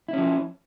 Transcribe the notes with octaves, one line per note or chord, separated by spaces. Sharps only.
F3 C#4 E4